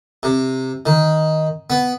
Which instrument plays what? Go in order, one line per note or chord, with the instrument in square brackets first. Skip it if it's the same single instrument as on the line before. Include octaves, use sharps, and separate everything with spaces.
[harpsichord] C3
D#3
B3